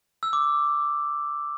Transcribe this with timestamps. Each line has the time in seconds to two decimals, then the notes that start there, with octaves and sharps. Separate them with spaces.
0.23 E6
0.33 D6